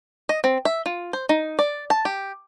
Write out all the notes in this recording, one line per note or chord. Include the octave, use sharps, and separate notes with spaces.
D#5
C4
E5
F4
C5
D#4
D5
A5
G4